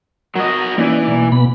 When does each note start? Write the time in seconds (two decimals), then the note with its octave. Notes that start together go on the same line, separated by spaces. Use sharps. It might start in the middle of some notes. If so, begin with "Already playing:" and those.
0.36 F#3 A#4 D#5
0.78 E3 A#3 C#4 D#4 D5
1.07 B1 A#3
1.32 B2 B3 B5